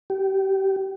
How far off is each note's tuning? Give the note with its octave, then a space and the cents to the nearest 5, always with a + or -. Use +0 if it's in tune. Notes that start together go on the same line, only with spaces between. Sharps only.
G4 -25